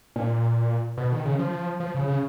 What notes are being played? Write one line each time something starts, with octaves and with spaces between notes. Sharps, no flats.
A#2
B2
D#3
C#3
F3
F3
C#3
C#3